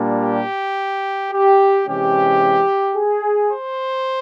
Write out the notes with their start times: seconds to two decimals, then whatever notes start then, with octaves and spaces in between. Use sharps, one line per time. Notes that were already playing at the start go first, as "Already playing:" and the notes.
Already playing: A#2 G3 A#3 D4
0.21 G4
1.31 G4
1.86 C3 E3 G#3 C#4 G4
2.95 G#4
3.50 C5